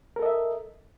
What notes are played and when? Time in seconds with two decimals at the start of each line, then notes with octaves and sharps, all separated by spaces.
0.16 A#4
0.19 A4
0.22 D#5
0.26 E5